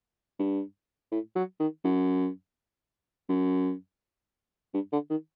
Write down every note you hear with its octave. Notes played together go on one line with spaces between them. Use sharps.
G2
A2
F#3
D#3
F#2
F#2
G2
D3
D#3